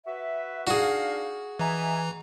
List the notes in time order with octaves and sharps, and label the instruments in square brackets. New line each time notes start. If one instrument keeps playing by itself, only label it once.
[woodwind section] F#4 B4 E5
[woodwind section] D4 D#4 F5 [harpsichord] F#4 G#4
[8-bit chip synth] E3 A#5 [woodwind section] D#4 E5 G#5